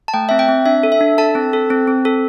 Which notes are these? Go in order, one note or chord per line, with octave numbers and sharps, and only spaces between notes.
A5
A3 G5
C4 E5
G5
C4
D4 E5
A4
E5
D4
A4 A5
C4
A4
C4
C4
A4